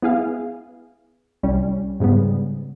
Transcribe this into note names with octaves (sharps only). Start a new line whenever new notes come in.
B3 E4 G#4 F5
C2 G3 C#4
G#2 C#3 G3 B3